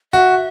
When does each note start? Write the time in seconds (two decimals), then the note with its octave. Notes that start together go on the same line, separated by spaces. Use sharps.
0.13 F#4 E5